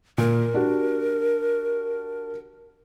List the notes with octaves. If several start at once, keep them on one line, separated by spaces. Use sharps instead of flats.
A#2 A#4
D4 F#4 G4